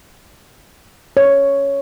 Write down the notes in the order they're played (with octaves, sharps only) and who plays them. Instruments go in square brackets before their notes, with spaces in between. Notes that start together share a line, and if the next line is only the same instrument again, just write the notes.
[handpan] C#5